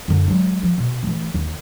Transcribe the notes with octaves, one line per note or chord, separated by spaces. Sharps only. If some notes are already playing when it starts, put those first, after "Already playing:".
F#2 D3
F#3 G#3
F3
B2
E3 A3
D#2